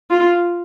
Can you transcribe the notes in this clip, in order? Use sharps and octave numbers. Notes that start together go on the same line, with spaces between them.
F4